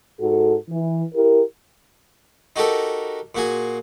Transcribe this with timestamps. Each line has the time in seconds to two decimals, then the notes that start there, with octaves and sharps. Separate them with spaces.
0.20 G#2 F#4 A4
0.69 E3
1.15 E4 G4 A#4
2.56 D#4 F#4 G4 A4 A#4
3.35 A#2 F#4 G#4